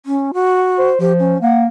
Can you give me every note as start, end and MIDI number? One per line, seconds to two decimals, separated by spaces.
0.06 0.31 61
0.34 0.89 66
0.78 0.98 72
1.00 1.36 53
1.00 1.13 67
1.19 1.38 61
1.42 1.66 58
1.42 1.59 78